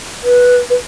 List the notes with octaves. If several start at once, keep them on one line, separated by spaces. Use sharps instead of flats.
B4
B4